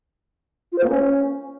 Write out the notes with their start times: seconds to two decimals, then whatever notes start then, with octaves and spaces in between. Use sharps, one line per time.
0.72 F4
0.78 C5
0.84 A#3
0.90 C#4